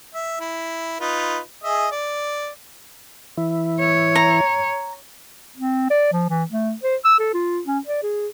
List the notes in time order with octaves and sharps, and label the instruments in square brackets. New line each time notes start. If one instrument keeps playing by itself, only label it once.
[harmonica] E5
E4
D#4 F4 B4
G#4 D#5 E5
D5
[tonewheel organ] E3 E4
[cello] C#5
[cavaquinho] A#5
[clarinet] C4
D5
F3
E3
A3
C5
E6
A4
F4
C#4
D5
G#4